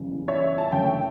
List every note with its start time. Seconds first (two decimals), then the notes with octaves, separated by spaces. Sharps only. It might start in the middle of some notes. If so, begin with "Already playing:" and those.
Already playing: F#1 E2 C#3 G3
0.28 C#5 E5
0.58 A5
0.72 F#1 F#2 D3 A3 E5 G5